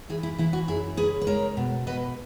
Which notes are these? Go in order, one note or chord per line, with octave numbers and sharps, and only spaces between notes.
E3 E4 G#4
E4
E3 E4
F#4
F#2 E4 G#4
C#3 G#4 B4
B4
G#3 A#4 C#5
B2
B2 B4 D#5